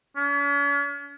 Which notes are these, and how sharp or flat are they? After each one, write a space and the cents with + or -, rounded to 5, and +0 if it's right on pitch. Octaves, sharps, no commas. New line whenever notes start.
C#4 +45